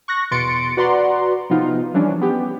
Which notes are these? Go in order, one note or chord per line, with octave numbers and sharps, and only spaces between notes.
C#6 F#6 A#6
E2 B2 C6 A6 C#7 D7
F#4 B4 D5 F#5 A#5 C6
C3 F3 B3 D#4 F4
E3 F3 G3 C#4 D4
B3 G4